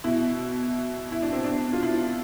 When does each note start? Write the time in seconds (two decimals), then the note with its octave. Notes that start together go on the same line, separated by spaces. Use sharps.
0.04 B2 E4
1.12 E4
1.22 D4
1.33 C4
1.44 B2 D4
1.73 F4
1.83 E4